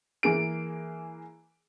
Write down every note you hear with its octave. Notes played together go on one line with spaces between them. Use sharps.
E3 A#3 G#4 D7